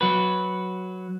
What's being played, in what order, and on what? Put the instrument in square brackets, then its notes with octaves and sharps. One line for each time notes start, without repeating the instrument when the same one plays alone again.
[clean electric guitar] F#3 F#4 B4